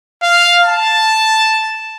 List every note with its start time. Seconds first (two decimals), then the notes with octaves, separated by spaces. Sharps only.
0.22 F5
0.64 A5